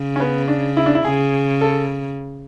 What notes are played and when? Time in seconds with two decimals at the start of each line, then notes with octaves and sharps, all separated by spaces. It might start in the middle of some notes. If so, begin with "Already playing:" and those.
Already playing: C#3
0.16 C#4
0.20 B3
0.48 D4
0.77 E4
0.86 D4
0.95 E4
1.05 C#3 G#4
1.61 A4